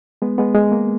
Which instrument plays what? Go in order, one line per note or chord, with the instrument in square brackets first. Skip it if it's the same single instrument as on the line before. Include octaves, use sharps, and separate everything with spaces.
[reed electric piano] G#3 B3
G#3 B3
G#3
A#3